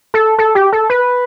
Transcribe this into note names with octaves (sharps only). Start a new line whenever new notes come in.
A4
A4
G4
A4
B4